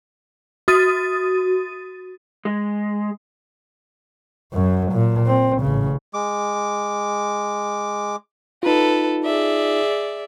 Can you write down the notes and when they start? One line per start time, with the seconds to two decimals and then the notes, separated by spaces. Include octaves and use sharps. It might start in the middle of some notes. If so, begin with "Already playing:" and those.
0.68 F#4 D#6 A6 D#7
2.45 G#3
4.53 F#2 F#3
4.92 A#2
5.27 C4
5.62 A1 C#3
6.14 G#3 D6
8.63 D#4 F4 A4 B4
9.26 G#4 D5 E5